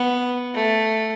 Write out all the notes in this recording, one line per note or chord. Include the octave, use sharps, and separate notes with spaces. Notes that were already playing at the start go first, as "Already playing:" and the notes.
Already playing: B3
A3